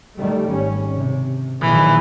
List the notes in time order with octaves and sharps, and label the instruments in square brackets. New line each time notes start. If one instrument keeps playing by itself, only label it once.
[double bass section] D#3 G3 A3
G#1 C#4
C3
[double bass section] A#1 D#3 F#3 [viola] E3